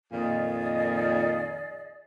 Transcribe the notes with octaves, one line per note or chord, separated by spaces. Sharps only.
F2 A#2 D#3 G#4 D5 D#5